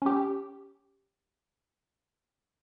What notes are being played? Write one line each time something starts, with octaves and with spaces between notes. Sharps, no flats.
C#4 G4